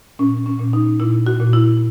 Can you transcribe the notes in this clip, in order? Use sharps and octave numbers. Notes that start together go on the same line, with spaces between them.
A#2 C#4
C#4
A#2
D#4
A#2 E4
F#4
A#2
E4